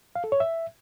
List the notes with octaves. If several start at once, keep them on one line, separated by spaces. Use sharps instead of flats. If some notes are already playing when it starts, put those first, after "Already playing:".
F5
A4
C#5
E5